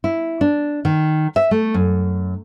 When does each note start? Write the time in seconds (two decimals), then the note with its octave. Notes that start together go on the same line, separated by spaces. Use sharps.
0.04 E4
0.41 D4
0.85 D#3
1.36 E5
1.51 A3
1.74 F#2